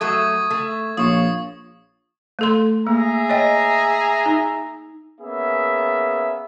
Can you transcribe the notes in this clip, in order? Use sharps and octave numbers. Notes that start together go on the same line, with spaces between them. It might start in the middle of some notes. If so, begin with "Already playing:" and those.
F#3 A3 A4 C#6 D#6 G#6
A3
A#1 F4 C#5 C#6 D#6
A3 A4 C6
A#3 G#4 E5 A#5
C#5 D#5 G5
D#4
A#3 B3 C#4 G#4 E5